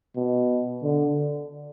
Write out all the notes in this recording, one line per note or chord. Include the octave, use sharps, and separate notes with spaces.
B2
D3